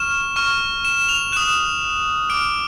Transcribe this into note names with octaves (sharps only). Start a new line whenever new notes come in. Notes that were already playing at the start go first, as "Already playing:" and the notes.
Already playing: C#6 F6 E7
C#6 F6
E7
F7
D#6 F#6 E7
D6 F6 D7